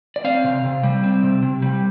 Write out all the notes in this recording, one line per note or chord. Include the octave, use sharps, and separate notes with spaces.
D5
C4 F5
C3
C3
G3
C4
C3
C3
G3